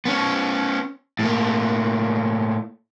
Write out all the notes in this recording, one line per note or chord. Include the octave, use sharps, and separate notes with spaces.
B3 C#4
A2 A#3